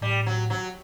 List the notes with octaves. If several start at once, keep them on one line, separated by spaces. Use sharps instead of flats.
A2 G3
F#3
F#3